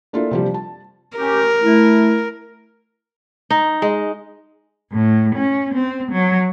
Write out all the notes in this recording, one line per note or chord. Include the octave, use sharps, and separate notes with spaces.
A#3 D4 E4 F4 A4
C3 F3 G3
A5
C#4 G4 A#4
A3 E4
D#4
G#3
A2
C#4
C4
F#3